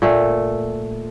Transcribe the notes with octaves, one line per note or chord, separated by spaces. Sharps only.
A#2 A3